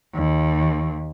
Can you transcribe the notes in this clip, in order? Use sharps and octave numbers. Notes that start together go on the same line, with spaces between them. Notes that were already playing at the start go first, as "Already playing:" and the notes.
D#2